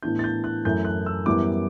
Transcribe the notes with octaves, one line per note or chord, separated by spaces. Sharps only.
A2 E3 B3 D4 G6
A6
G6
F#6
F#2 E3 A3 E4 G6
F#6
E6
F#2 E3 G3 B3 E4 D6